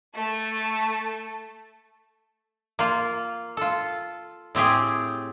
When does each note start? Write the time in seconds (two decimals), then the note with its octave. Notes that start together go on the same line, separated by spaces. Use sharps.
0.14 A3 A4
2.79 A#3 F4
3.57 F4 A4
4.55 A2 C4 G4 G#4